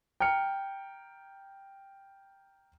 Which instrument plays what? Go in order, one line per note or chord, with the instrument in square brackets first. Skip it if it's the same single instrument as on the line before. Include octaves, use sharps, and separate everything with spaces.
[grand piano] G5 A#5 F6 C#7